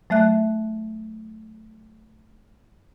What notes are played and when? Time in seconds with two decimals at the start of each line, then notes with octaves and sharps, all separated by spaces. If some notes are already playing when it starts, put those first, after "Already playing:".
0.10 F#3 A3 E5 F#6